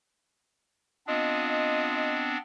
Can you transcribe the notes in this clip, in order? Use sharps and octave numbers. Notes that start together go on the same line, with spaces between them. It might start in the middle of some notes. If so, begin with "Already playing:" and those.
B3 C4 D4 F4 D#5